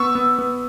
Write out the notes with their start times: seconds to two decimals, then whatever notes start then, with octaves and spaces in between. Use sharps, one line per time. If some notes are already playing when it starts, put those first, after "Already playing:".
Already playing: B3 C#6 E6
0.15 B3
0.39 B3